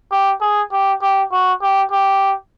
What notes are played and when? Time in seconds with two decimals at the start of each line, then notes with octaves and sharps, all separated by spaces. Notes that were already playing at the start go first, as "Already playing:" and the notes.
0.11 G4
0.41 G#4
0.72 G4
1.02 G4
1.32 F#4
1.62 G4
1.91 G4